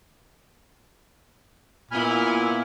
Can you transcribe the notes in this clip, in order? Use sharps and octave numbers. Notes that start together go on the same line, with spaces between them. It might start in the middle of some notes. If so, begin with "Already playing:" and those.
A#2 B3 E4 G#5 B5 F6